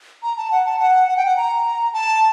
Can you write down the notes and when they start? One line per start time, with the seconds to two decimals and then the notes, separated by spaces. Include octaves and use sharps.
0.23 A#5
0.37 A5
0.51 F#5
0.66 A5
0.80 F#5
1.08 F#5
1.17 G5
1.26 F#5
1.37 A#5
1.93 A5